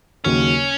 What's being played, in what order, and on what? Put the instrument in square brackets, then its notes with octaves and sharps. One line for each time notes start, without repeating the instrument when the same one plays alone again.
[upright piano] D#2 C#3 F#3 A#3 [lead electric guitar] C#4